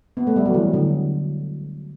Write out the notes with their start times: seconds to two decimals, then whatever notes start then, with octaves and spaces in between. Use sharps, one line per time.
0.17 B3
0.27 A3
0.36 G3
0.45 F#3
0.54 E3
0.74 D3